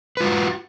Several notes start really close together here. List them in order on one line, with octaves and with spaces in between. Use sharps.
B4 F4 F#4